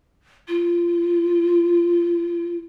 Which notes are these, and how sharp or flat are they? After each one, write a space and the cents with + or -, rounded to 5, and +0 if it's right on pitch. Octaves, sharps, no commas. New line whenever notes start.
F4 -25